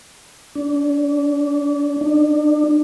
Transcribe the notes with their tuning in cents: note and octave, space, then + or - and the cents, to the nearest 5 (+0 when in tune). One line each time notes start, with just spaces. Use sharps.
D4 -35
D4 +35